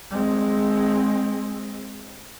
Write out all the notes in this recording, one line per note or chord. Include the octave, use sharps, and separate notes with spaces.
G#3 C4